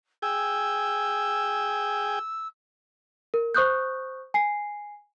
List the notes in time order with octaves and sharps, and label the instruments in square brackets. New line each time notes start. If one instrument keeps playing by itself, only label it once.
[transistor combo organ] G#4 G5 [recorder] E6
[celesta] A#4
C5 C#6 D#6 F#6 G6
G#5 C7